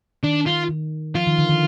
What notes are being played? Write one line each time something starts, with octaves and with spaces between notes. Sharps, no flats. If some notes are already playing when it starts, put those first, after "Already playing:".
D#3 D4
F4
D#3
F3 F4
D#3
D3
D#3